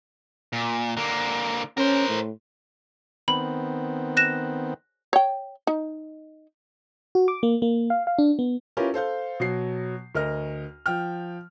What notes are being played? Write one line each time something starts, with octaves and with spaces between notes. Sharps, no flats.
A#2
D3 A#3
C#4 A#4 C5
A2
D#3 B3 C4 B5
F#6 A#6 E7
C#5 G5
D#4
F#4
D6
A#3
A#3
F5
F5
D4
B3
C#4 E4 F4 G4 A#4 B4
A4 C5 F5 G6
B2 F#3 C7
D2 A#4 D#5 F6
F3 G5 F6